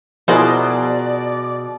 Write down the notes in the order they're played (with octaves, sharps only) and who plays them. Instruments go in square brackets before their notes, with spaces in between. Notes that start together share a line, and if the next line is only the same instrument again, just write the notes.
[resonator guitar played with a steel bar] B2 [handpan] F3 G#4 A#4 [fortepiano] E4 C5 D#5 [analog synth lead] D5